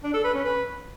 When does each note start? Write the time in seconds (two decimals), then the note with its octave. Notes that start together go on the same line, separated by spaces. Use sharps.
0.03 D4
0.14 A4
0.24 B4
0.34 C#4
0.44 B4